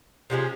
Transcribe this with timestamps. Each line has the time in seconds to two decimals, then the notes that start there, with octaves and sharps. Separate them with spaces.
0.30 C3 F3 G#3 C#4